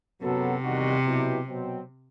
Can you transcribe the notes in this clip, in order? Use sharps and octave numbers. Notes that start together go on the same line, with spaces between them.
F#2 C3 F#3 B3 F#4 A4
E2 D#3 G3 D#4 F#4
B2 F#3 B3 E4 G4
B2 F#3 C4